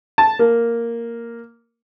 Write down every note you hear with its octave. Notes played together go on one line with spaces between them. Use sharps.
A5
A#3